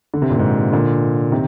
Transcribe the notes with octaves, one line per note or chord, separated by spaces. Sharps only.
D3
C3
A#2
G#2 C3
A#2 D3
C3 D#3